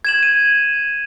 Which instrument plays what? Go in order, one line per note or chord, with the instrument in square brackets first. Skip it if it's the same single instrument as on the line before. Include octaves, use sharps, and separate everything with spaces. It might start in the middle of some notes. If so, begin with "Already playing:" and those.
[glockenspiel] G#6 E7 F#7
D#7